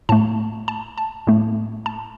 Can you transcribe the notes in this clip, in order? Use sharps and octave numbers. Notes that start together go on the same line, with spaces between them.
A2 A3 A5
A5
A5
A2 A3
A5